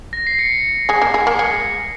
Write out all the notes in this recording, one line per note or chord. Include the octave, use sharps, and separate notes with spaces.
A#6
C7
C#7
G#3 G#4
A#3 A#4
G#3 G#4
A#3 A#4
C7
G#3 G#4 C#7